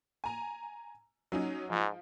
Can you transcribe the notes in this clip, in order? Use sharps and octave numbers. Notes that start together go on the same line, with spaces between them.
G#5 A#5
F#3 C#4 D#4
G#2 F3